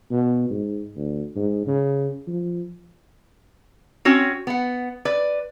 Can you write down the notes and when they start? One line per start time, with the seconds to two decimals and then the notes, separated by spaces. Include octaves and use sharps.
0.11 B2
0.50 G#2
0.96 D2
1.36 G#2
1.66 C#3
2.27 F3
4.05 C4 C#4 F#4 C#5
4.47 B3 F#5
5.05 B4 D5